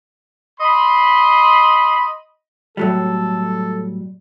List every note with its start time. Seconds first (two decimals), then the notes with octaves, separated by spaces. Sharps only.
0.60 D#5 B5 C6
2.77 A2 F#3 G3 A4